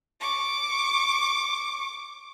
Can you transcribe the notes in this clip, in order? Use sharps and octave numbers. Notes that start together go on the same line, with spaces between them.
C#6 D6